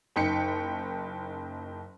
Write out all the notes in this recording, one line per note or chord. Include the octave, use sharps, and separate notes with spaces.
F#1 D#4 G5 B6 C#7